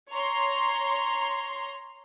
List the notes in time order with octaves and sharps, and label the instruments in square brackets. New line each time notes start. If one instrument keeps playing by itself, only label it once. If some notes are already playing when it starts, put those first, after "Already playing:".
[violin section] C#5 A#5 C6